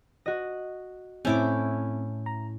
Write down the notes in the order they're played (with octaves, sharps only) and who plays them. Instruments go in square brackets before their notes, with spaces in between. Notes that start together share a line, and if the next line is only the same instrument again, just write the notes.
[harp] F#4 D#5
[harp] A2 A3 G6 [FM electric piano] C4 [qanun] C#4 E4 D6
[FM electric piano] A#5